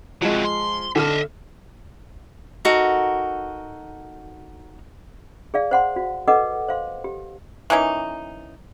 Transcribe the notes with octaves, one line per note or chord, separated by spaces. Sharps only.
C3 F3 F#3 G#3
C6
D3 A4 D#5 E5 F6
D#4 F#4 A4 A#4
G#4 D5 F5
C5 F#5 C6
F#4
A4 B4 D#5 F#5 D6
C5 F5 C6
G4
E3 A#3 C#4 D#4